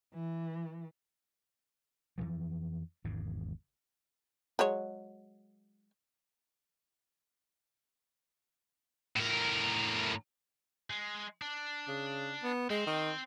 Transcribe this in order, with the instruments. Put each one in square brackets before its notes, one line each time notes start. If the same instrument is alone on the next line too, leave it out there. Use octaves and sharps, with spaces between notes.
[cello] E3
[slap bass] F2 C#3 E3 F3
G#1 E2 G#2 C#3
[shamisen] F#3 G#3 C#5
[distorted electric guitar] A2 A#4
G#3
D4
[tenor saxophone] C#3
B3
[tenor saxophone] G#3 [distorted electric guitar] C4
[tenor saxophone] D#3